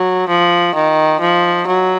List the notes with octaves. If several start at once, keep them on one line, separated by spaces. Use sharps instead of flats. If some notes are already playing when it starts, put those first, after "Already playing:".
Already playing: F#3
F3
D#3
F3
F#3